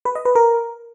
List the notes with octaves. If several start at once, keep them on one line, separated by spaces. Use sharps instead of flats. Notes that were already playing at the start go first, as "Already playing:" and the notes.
B4
D#5
B4
A#4